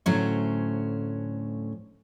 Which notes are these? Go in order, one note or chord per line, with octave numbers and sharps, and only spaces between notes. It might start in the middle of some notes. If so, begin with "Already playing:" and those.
D2 A2 F#3 C#4 C5